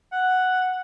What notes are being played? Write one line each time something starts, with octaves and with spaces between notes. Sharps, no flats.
F#5